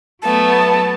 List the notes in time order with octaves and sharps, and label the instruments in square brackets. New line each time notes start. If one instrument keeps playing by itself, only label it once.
[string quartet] F#3 A3 B3 [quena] A5